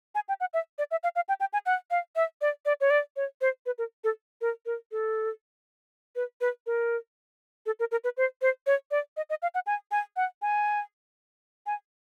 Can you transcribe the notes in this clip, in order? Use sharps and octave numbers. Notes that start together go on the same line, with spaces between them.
G#5
G5
F#5
E5
D5
E5
F5
F5
G5
G5
G#5
F#5
F5
E5
D5
D5
C#5
D5
C#5
C5
B4
A#4
A4
A#4
A#4
A4
B4
B4
A#4
A4
A#4
A#4
B4
C5
C5
C#5
D5
D#5
D#5
F5
F#5
G#5
G#5
F#5
G#5
G#5